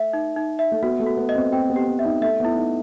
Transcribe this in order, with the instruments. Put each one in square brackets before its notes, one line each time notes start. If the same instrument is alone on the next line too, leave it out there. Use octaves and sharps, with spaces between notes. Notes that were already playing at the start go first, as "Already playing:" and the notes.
Already playing: [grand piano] A3 [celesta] E5
[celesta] D#4
D#4
E5
[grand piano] A3
[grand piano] B3 [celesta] F#4
[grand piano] A3
[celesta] F#4
[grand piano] B3
[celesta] D#5
[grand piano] C4
[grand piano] C4 [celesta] G5
[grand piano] B3
[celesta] G4
[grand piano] C4
[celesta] E5
[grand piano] D#4
[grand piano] A3 [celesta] E5
[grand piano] B3 [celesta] E4
[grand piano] D#4